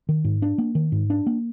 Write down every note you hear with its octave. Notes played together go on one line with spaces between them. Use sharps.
D#3
G#2
D4
A#3
D#3
G#2
D4
A#3